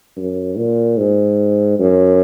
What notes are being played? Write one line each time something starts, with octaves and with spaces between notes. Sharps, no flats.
F#2
A#2
G#2
F#2